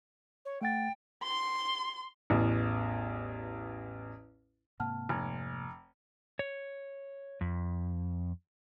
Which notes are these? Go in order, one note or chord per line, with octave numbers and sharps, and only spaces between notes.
C#5
A3 F#5 G5 A6
C6
A1 E2
G#2 C3 A#3 F#5 A5 F6
F1 G#5 G#6
C#5
F2